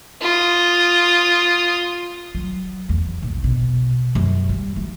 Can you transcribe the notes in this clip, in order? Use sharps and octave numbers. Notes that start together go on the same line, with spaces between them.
F4 D#6
F#3
E2
A#1
B2
F#2
G3
E3